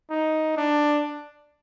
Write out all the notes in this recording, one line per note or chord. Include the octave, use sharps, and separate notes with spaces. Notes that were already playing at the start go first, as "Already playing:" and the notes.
D#4
D4